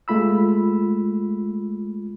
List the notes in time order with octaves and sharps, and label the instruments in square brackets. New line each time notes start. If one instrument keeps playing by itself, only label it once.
[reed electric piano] G#3 A3 F4 B5 E6